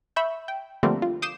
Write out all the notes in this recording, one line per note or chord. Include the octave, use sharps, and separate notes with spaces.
E5 B5 C#6 G6
G5
D3 F3 G3 A3 A#3 C4
F4
D6 D#6 G6 C7 E7